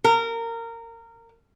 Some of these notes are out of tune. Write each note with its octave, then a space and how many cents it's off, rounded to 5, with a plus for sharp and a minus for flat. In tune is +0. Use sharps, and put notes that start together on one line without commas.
A#4 -20